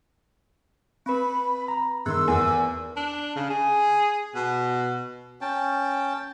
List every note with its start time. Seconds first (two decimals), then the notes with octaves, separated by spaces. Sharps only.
1.06 C4 B4 B5
1.68 A#5
2.06 G2 D#3 B3 G#4 C6 E6 F#6
2.28 E2 A#4
2.97 D4
3.36 C#3
3.50 G#4
4.35 B2
5.41 C#4 G5 A5